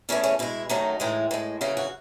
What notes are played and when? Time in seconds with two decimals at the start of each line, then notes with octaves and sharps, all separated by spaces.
0.09 E2 C#3 E3 A3 C#4
0.24 C#4
0.39 B2 G#3 E4
0.69 F#2 D#3 F#3 A3 D#4
1.00 A2 E3 G#3
1.31 A2 G#3
1.61 F#2 C#3 E3 F#4
1.77 F#4